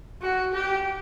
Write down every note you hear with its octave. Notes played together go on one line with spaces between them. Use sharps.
F#4
G4